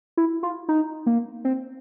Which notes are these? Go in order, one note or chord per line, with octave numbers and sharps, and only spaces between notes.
E4
F4
D#4
A#3
C4